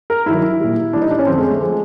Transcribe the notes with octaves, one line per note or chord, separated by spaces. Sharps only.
A#4
G2 D#3 F#3 E4
A#2 G3
A2 E3 G3 D4
D#4
D4
C#4
F2 D3 G3 C4
G#3
A3
F3 G#3